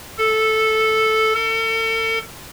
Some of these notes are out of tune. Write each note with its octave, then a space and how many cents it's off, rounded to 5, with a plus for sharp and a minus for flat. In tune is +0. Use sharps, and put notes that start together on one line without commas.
A4 -5
A4 +40